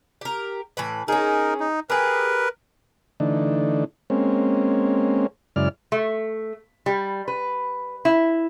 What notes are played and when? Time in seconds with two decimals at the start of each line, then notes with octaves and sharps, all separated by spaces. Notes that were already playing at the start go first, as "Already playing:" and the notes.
0.21 G4 A#4
0.77 A2 E3 B4
1.08 C#4 D#4 G#4 A#4
1.60 D#4
1.90 G4 G#4 A#4 B4
3.20 D3 E3 A3 D4 D#4
4.10 G#3 A#3 C4 C#4
5.56 F#2 C#3 G#3 E4 D5 F6
5.92 A3
6.86 G3
7.28 B4
8.05 E4